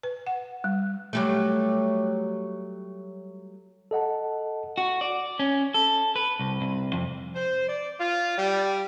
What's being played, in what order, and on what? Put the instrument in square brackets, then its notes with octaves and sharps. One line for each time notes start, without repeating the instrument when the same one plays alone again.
[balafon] B4
F#5
G3
[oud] F#3 G3 A3
[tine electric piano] A4 D#5 F#5 A5
[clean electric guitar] F#4
D5
C#4
A4
B4
C2
C2
F2
[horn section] C5
D5
F4
G3